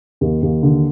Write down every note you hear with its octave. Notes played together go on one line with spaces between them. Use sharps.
D#2
D#2
D3